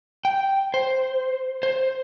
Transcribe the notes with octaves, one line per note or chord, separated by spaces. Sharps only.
G5
C5
C5